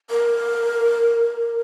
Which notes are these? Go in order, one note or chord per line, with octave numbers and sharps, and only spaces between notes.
A#4